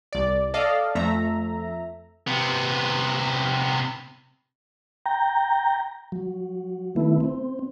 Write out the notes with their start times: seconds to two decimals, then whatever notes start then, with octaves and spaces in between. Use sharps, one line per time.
0.13 C2 D5
0.54 A4 D5 D#5 F5
0.95 F2 A3 E5 A#5
2.27 C3 B3
5.06 G5 A#5
6.12 F#3
6.96 D#3 A3 B3 E4
7.20 C4